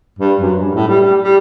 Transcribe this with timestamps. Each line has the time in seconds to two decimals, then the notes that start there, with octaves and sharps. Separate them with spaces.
0.19 G2
0.39 F#2
0.60 G2
0.74 A2
0.87 G3
1.01 G3
1.22 G3